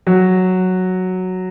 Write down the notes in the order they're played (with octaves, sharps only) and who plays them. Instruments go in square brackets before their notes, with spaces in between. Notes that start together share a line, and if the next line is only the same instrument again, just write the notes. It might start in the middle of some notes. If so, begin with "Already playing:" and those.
[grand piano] F#3